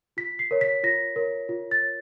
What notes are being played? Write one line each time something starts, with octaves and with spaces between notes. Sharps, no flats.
F4 B6
C7
A#4 C#5
B6
F4 A#6
A#4 C#5
F4
A6
A#4 C#5